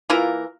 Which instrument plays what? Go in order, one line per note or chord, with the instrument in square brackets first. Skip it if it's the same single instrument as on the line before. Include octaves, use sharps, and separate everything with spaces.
[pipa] E3 A#3 E4 A#4 [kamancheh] F4